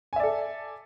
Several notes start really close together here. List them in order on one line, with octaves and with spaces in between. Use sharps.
G#5 E5 D5 A4